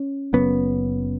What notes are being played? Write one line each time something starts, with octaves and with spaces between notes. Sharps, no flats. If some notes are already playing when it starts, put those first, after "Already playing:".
Already playing: C#4
F#1 F#2 C#3 B3